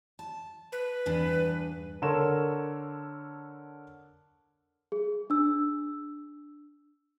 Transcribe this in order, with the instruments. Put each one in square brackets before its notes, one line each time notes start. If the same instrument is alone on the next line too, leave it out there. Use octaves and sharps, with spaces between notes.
[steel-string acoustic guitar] A5
[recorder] B4
[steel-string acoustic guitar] E2 G2 D4
[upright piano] D3 A4 A#4 C#5 C6 E7
[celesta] G#4
D4 E6